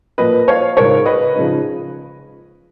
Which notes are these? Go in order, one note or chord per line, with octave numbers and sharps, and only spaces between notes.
A#2 F3 A#3 B4 D#5
C#5 F5
C#2 C#3 G#3 D#4 A#4 C#5
B4 D#5
C#3 F3 G#3 D#4